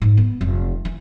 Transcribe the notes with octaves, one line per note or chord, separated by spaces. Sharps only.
G#2
B3
F1
E3